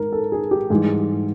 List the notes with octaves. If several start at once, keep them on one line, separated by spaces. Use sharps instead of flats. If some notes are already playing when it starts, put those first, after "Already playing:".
Already playing: G#2 A#4
A4
G#4
G4
G#2 E3 G3 G#4